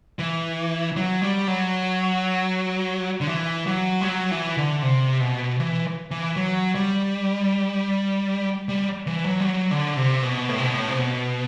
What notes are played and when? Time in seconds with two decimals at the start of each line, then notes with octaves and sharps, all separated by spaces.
0.19 E3
0.97 F#3
1.22 G3
1.48 F#3
3.21 D3
3.27 E3
3.67 F#3
4.01 G3
4.05 F#3
4.31 E3
4.57 D3
4.82 C3
5.20 B2
5.60 E3
6.11 E3
6.36 F#3
6.75 G3
8.69 G3
9.07 E3
9.26 F#3
9.40 G3
9.45 F#3
9.71 D3
9.96 C3
10.23 B2
10.49 A2
10.58 C3
10.65 B2
10.74 A2
10.88 C3
10.99 B2